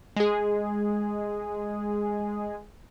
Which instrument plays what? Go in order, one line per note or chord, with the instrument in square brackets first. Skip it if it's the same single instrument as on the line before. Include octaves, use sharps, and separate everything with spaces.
[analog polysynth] G#3 G#4